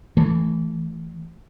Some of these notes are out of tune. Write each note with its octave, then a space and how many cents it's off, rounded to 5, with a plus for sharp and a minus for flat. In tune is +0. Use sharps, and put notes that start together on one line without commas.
E3 +0 A3 +0